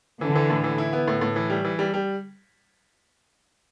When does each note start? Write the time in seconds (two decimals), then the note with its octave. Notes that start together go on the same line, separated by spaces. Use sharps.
0.21 D3 E3
0.35 E3
0.50 A2
0.64 E3
0.78 E4
0.93 B3
1.08 A2
1.21 A2
1.36 E3
1.50 G3
1.65 E3
1.79 G3
1.94 G3